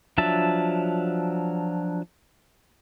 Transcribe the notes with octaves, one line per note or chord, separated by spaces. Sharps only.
F3 F#3 D4 E5 A5